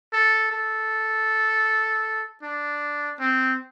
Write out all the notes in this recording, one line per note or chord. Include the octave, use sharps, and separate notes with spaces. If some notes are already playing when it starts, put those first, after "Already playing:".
A4
A4
D4
C4